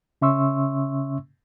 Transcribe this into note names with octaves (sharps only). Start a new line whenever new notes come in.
C#3 C#4 E5 C6 C#6 E6